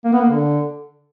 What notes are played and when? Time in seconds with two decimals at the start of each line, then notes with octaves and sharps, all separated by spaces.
0.05 A#3
0.13 B3
0.21 A#3
0.30 D3